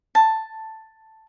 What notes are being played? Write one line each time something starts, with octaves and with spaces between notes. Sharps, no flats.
A5